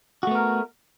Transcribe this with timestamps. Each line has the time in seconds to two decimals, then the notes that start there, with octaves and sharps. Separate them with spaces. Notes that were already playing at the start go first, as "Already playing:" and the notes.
0.23 F#4
0.27 A3
0.31 B3
0.35 A#4